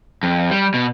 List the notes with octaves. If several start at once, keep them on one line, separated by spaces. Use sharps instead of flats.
F2
G3
B2